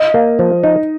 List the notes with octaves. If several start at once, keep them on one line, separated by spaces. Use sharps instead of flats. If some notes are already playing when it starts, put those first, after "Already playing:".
Already playing: D#5
A#3
F3
D#4